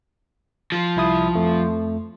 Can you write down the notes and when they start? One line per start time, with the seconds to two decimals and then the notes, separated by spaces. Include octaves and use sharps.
0.72 F3
0.96 C2 E4 D#6
1.35 F2 A3